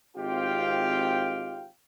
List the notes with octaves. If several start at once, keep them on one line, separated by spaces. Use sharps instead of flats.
G#1 C4 F4 G4 F5 G5